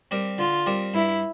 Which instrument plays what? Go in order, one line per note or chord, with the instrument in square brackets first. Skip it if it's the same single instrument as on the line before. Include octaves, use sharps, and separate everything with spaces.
[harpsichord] G3 C4 G4 A#4
[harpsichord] D3 [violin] F4
[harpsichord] G3 C4 G4 A#4
[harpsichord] G2 [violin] E4